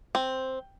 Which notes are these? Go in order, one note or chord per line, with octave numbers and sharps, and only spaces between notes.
C4